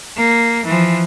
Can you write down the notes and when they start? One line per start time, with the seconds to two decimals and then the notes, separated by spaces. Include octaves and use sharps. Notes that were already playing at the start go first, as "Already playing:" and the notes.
0.17 A#3
0.66 E3 F3